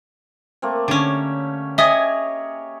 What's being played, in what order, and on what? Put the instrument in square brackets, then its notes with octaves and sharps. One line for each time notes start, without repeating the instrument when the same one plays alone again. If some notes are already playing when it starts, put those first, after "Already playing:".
[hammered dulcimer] A3 A#3 C4
[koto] D3 C#4 [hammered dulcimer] G4 C#5 E5
[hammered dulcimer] G4 G#4 C#5 [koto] D#5 G#5 [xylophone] E5 D#6